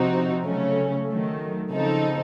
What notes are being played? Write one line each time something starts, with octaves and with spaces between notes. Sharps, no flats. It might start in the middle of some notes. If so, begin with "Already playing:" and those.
Already playing: C3 F3 C4 D#4 F#4
C#3 F#3 A3 C#4
D#3 F#3 A3
C#3 F3 C4 D#4 A4